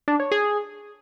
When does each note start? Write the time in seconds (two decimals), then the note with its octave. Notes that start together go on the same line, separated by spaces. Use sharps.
0.08 D4
0.20 C#5
0.32 G#4